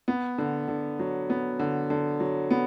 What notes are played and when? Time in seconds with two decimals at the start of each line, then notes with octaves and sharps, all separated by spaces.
0.08 B3
0.38 D3
0.68 D3
0.99 F#3
1.30 B3
1.59 D3
1.90 D3
2.20 F#3
2.51 B3